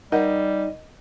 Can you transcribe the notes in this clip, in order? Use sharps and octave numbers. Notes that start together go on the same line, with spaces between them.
G3 D#4 A#4 D#5 F#5